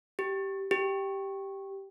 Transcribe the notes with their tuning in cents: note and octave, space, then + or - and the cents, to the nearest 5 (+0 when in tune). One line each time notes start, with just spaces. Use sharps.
G4 -10
G4 -5